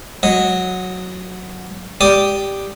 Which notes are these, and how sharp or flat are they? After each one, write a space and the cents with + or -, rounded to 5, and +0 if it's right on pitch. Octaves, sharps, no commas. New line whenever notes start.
F#3 -10 D#5 +0
G4 +0 D5 +0 D#6 +0